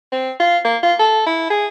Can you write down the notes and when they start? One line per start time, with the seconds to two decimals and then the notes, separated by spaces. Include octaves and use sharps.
0.12 C4
0.40 F4
0.65 A#3
0.83 F4
0.99 A4
1.26 E4
1.50 G#4